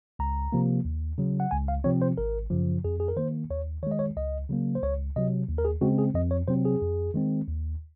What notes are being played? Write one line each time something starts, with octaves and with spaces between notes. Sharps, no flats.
C#2 A#5
C3 F3 A#3
D#2
C#3 F#3
F#5
C#2 G#5
F5
C3 F3 C4 C#5
C5
G#1 A#4
F#2 C#3 F3
F2 G#4
G#4
A#4
D#3 A#3 C5
D#2 C#5
D#3 G#3 C#5 D#5
C#5
C#2 D#5
C#3 F#3 A#3
C5
C#2 C#5
C3 F#3 D#5
D#2
A#4
G#4
C#3 G#3 C4 F#4
G#4
F2 D#5
C#5
C3 F#3 C4 C5
G#4
F2
D#3 G#3 C4
D#2